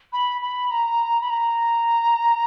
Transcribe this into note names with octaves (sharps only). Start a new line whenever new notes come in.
B5
B5
A#5
B5
A#5